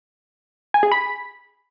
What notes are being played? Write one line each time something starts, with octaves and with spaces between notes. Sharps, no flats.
G#5
G#4
B5